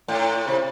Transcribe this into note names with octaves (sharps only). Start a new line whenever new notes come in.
A2
C3